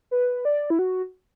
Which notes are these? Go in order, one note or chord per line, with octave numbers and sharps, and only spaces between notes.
B4
D5
E4
F#4